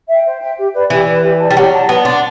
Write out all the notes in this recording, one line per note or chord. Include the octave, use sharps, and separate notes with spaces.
E5 G5
C5
E5 G5
G4
B4 D5
E3 G4
B4 D5
G4
D5 A5
G3
F#3 G4
D5 A5
B3 B4
D4 F#5 A5 C6